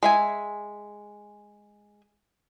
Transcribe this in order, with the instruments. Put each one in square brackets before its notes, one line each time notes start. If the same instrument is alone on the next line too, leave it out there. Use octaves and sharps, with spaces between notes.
[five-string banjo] G#3 E5 G#5